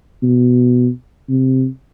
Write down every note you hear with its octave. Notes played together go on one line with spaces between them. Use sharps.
B2
C3